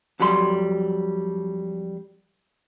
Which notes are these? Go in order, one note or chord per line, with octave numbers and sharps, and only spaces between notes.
F2 F#3 G3 B5 C6